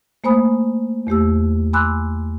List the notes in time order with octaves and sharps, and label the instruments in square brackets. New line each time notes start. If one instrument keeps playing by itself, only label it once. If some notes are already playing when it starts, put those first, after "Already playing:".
[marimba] A3 A#3 C5 G#5 B5 D#6
E2 A3 G4 E6
G#5 B5 C6 D6 E6 F#6